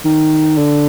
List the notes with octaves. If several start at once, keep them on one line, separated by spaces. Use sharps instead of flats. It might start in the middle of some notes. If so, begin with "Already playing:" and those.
D#3
D3